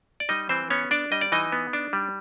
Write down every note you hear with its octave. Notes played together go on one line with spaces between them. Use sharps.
D5
G3 D#4 D#5
E3 C4 C5
B3 C#4 C#5
D4 D5
G3 D#5
D5
E3 D#4 D#5
B3
D4
G3